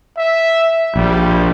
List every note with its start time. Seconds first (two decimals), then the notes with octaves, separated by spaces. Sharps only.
0.18 E5
0.96 A#1 G3